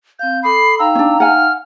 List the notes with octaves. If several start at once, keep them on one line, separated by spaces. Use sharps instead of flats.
C4 F5 G6
A4 B5 D6 D#6 C7
D#4 F5 G5 A#5 E6
C#4 D4
F#5 G#5 F6